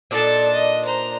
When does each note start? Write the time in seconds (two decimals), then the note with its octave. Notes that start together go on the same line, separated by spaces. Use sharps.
0.11 A#2 D4 D#4 A4 A5
0.53 D#5
0.85 C5 A#5